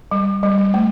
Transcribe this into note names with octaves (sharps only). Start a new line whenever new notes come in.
G3
G3
G3
A3